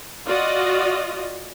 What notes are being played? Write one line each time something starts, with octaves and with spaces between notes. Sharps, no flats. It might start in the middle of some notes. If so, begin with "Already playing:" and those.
F4 F#4 D5 D#5